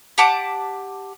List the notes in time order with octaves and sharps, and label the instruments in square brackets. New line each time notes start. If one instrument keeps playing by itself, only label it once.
[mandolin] G4 F#5 A5 D6